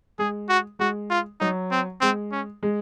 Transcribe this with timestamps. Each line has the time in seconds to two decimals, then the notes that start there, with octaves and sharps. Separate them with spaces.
0.19 G#3 G#4
0.49 F#4
0.79 G#3 F#4
1.10 F4
1.40 F#3 D#4
1.71 C4
2.01 G#3 C4
2.32 C#4
2.63 G#3